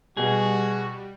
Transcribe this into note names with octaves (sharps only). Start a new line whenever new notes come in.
B2 G3 F#4 G#4